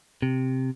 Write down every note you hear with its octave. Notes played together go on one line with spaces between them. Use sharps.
C3